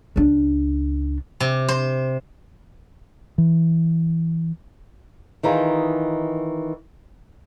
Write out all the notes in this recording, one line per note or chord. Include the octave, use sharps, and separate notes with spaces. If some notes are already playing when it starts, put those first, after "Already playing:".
C#2 D4
C3
C5
E3
D#3 E3 D#4 F4 G#4